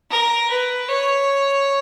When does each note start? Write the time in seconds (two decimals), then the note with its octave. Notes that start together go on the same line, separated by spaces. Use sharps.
0.10 A#4
0.50 B4
0.89 C#5